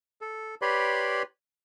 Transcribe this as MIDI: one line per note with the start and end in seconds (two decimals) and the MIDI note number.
0.21 0.55 69
0.62 1.23 67
0.62 1.23 71
0.62 1.23 73
0.62 1.23 74
0.62 1.23 83
0.62 1.23 84